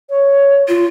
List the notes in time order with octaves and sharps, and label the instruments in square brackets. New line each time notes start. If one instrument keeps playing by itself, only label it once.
[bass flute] C#5
[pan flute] F4